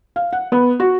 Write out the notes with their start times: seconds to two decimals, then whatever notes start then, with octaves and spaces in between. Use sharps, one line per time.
0.16 F5
0.33 F#5
0.52 B3
0.80 F#4